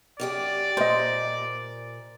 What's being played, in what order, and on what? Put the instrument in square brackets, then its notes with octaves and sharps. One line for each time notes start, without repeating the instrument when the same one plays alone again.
[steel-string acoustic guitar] F#2 G4 G#4 [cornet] D5
[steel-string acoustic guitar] A#2 [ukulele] C5 D#5